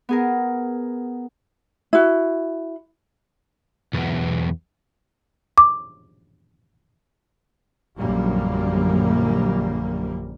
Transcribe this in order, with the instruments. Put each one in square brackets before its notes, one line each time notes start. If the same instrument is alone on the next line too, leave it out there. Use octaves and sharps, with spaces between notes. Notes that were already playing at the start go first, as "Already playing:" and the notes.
[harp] B3 G#4 A#4
[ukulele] E4 F#4
[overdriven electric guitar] B1 E2
[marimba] D6
[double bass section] A#1 F#2 D3 G3 A#3